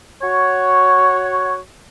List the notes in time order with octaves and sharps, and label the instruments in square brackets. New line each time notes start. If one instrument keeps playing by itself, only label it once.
[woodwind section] F#4 C#5